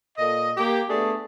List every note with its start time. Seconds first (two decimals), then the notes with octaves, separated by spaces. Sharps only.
0.18 A#2 A4 D#5
0.57 A#3 G4
0.89 A3 B3 D4 G#4 G#5